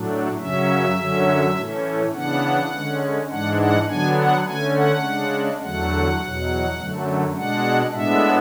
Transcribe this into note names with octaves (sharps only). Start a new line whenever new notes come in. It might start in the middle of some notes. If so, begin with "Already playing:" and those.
Already playing: A2 F#3 A3 D4
F#2 C#3 F#3 C#4 E5
F#2 D3 F#3 C#4
A2 E3 A3 C#4
C#3 E3 B3 D4 F#5
D3 G#3 C#4
G#2 E3 G#3 D4 F#5
F#5
D3 F#3 B3 D4 G#5
F#5
D3 A3 C#4 G#5
F#5
C#3 G#3 D4
E2 D3 F#3 A3 F#5
E2 B2 F#3
F#2 D3 F#3 A3
B2 G#3 D4 F#5
A2 G#3 B3 D4 E5